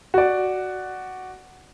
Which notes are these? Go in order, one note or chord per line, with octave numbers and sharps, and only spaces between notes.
F#4 D5